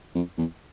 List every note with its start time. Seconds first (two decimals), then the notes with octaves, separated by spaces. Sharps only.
0.15 F2
0.38 E2